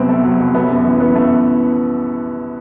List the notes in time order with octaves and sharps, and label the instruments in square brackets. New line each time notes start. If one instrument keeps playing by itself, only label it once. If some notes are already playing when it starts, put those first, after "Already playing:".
Already playing: [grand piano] C2 C3 F#3 [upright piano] B3 C4
[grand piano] A3
F#3
C2
[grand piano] A3 [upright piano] B3
[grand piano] F#2
E3
[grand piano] F#2 [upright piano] B3
[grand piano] A3